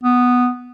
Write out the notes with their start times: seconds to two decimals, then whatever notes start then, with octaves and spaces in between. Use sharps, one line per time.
0.04 B3